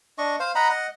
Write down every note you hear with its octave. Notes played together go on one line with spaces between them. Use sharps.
D4 D#5 C#6
C5 F5
D#5 F#5 A#5 B5
D#5 F#5